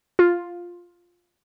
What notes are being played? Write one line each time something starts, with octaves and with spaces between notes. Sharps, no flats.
F4